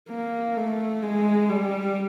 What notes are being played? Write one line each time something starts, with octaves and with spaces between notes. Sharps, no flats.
A#3
A3
G#3
G3